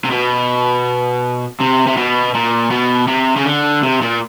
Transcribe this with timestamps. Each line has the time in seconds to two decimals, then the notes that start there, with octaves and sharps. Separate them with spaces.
0.04 C3
0.11 B2
1.60 C3
1.87 C3
1.97 B2
2.35 A#2
2.71 B2
3.08 C3
3.37 C#3
3.46 D3
3.83 C3
4.01 A#2